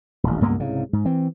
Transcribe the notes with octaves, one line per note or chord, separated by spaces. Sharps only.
D#1 A1
C#2 G2 A#3 B3
C2 G#2 C#3
G#2
E3 C4